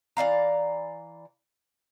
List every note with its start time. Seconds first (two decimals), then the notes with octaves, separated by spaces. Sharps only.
0.17 E3 D5 F5 A#5